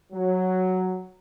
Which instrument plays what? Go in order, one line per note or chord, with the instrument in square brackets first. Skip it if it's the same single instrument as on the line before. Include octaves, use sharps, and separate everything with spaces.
[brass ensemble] F#3